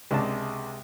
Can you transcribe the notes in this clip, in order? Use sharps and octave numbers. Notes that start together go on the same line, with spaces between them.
C#2 C3 G#3 D4 A5